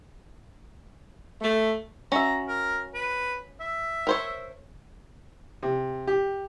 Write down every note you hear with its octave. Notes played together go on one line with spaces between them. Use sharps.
A3
C#4 F#4 E5 A#5
A#4
B4
E5
A#4 C5 C#5
C3
G4